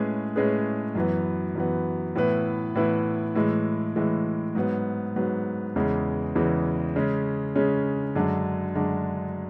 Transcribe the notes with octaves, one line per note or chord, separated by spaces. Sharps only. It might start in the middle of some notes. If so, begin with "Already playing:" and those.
Already playing: A2 G#3 C#4 G#4 B4
A2 G#3 C#4 G#4 B4
F#2 E3 B3
F#2 E3 B3
A2 E3 B3 E4 B4
A2 E3 B3 E4 B4
A2 E3 G#3
A2 E3 G#3
G#2 F#3 B3
G#2 F#3 B3
E2 C#3 E3 G#3
E2 C#3 E3 G#3
C#3 G#3 C#4
C#3 G#3 C#4
F#2 D3 G#3 D4
F#2 D3 G#3 D4